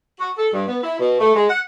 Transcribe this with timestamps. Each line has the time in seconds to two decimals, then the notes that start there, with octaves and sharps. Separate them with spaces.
0.20 F#4
0.37 A4
0.52 G2
0.67 B3
0.83 E4
0.99 B2
1.19 A3
1.36 G#3
1.49 F#5